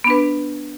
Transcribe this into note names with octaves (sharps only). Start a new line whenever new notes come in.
B3 D4 B4